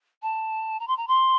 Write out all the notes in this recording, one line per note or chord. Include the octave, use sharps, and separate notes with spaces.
A5
A#5
C6
A#5
C6